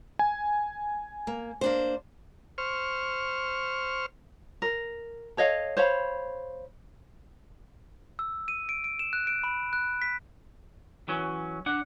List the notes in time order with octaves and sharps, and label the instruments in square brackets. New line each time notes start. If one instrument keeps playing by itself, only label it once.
[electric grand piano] G#5
[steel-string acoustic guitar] A#3
A#3 D4 C5
[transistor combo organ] C5 C#6 F6
[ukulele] A#4
A4 C#5 D#5 F5
C5 C#5 F5 B5
[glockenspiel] E6
D#7
D7
D7
E7
F#6
D7
B5
F#6
B6
[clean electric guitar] E3 F#3 C#4
D4 F#5